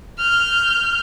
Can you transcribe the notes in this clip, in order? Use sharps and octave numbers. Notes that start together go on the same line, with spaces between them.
F6 G6